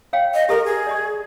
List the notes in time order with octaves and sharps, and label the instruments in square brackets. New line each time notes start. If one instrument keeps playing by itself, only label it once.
[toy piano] C#5 F5 G5
[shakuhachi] D#5
[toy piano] G4 A4 [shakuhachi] A#4
[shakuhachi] G#4
[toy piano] D5 D#5 C#6